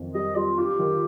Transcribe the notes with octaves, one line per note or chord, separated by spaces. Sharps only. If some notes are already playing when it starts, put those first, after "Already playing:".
Already playing: F2 D#3
G3 D#5
G3 F4
F4 G4
D#3